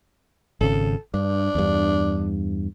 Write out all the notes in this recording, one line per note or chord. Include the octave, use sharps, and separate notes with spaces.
G#1 C#3 A4
G2 D4
E2 G2